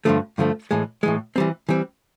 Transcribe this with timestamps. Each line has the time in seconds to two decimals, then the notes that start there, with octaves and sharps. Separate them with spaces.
0.05 G2 D3 F3 A3
0.38 G2 D3 F3 A3
0.71 A2 E3 G#3
1.03 A2 E3 G#3
1.36 E3 G3 C4
1.69 E3 G3 C4